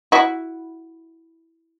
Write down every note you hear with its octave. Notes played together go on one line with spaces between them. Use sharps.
E4 F#4